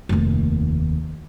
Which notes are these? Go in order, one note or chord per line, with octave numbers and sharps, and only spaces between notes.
F1 D#2